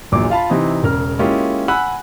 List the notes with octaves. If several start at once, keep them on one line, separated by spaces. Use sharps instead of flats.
A#1 E2 A#2 F#3 D6
F4 F5 A5 B5
C3 E3 C4 D#4
E1 C#3 A#4 F6
G#3 A#3 C#4 E4 F4 G4
F#5 G#5 B5 E6 F#6